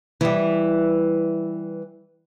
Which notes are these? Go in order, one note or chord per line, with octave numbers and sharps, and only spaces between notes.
E3 G3